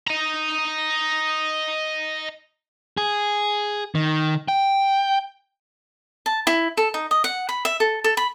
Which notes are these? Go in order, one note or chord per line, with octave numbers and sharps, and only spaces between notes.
D#5 A#5
G#4
D#3
G5
A5
E4
A4
D#4
D#5
F#5
B5
E5
A4
A4
B5